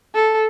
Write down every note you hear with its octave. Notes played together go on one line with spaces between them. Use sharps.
A4